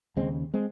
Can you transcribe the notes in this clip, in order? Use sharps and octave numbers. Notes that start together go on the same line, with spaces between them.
D#2 C#3 G#3 C4
G#3 C4